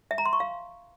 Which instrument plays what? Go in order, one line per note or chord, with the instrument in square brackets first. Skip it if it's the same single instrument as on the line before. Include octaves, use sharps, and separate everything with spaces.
[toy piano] E5
A#5
C6
C#6
F5